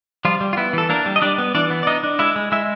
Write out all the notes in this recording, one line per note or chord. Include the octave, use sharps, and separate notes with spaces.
F3 G3 F4
G3
F4
B3 E4
E3 A4
A#3 D4 A#4
G3
D#5
G3 D4 D5
B3
E3 D4 D5
B3
D5
D4 D#4 D#5
D4
G#3 E4 E5
G#3
G#3 E4 E5